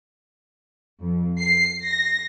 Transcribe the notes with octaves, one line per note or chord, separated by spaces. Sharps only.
F2
C7
A#6